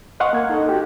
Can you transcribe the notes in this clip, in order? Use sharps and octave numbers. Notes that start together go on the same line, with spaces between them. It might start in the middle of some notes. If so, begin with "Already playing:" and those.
D#5 F5 F#5 C6 C#6
A#3 G#6
D#4 A4 D#5
F#4 G4